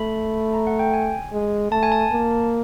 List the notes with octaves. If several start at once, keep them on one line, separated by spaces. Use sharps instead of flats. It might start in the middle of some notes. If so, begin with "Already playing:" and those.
Already playing: A3 B5
A#5
F#5
G5
G#5
G#3
A3 A5
G#5
A5
A#3